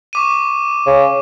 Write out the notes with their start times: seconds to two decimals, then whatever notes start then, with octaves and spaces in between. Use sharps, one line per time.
0.13 C#6 D6 D#7
0.87 C#3